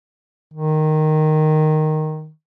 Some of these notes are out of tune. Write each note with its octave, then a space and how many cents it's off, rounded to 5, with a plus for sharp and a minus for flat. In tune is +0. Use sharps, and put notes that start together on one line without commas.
D#3 -5